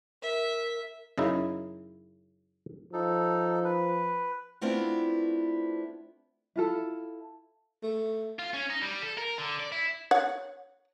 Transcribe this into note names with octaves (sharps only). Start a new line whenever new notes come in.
A#4 E5
F#2 C#3 D#4 E4
F3 D#4 A4
B4
A3 B3 C4 D4 E4 F4
E4 F4 A4
A3
F4
C#4
D#4
G3
A4
A#4
D3
D5
E4
C#5 F#5